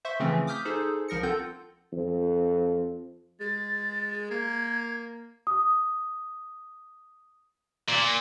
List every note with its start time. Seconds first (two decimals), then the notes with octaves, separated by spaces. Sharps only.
0.05 C5 E5 C6 C#6
0.20 C#3 E3 F3 A3 C4 C#4
0.47 D6 D#6 F6 G6 B6
0.65 D#4 G#4 A4 C5
1.08 C2 F3 A#4 A#6 C#7
1.23 C4 F4 A4 F#5 G6
1.93 F2
3.40 G#3 A6
4.31 A#3 G#6
5.47 D#6
7.89 A#2